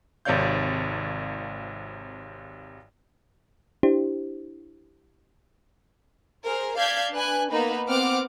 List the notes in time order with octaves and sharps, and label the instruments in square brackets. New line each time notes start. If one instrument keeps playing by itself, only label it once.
[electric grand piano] G#1 C3 C#5 D5 F5 G6
[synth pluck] D4 E4 G4 C5
[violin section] G#4 A#4 C5
D5 F5 A5 G6 G#6 B6
D4 B4 G#5 F#6
A#3 B3 D#4 B4 B5
B3 C4 F#5 D6 F6